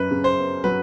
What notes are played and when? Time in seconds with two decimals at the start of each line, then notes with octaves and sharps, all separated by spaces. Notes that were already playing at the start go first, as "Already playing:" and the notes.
Already playing: F#2 B4
0.11 C#3
0.24 C5
0.38 B3
0.64 F#3 B4